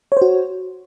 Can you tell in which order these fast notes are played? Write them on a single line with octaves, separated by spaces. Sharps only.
C#5 C5 F#4